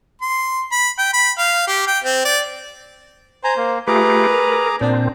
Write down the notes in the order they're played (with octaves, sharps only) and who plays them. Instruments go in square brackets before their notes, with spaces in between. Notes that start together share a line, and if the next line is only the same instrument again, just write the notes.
[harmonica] C6
B5
G5
B5
F5
G4
G5
C4
D5
[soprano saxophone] C5 [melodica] G#5 A#5
[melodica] A#3
[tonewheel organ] A3 F4 G4 [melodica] G#4 A#5 D6 [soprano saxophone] B4
[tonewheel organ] A#4
[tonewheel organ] A#2 C4 [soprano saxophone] D4